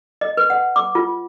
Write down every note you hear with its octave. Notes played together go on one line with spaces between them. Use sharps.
D#5
B4
F#5
D6
F4